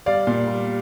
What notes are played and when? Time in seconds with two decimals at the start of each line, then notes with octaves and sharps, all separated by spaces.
0.06 G3 D5 F5
0.27 A#2
0.47 G3